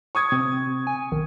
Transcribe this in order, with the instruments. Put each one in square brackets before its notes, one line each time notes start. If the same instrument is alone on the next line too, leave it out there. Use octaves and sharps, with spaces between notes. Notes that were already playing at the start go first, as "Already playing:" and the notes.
[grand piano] C#6 D#6 G#6
[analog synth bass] C3 [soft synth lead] C4
[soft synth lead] G#5
[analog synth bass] B1 [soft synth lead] D#3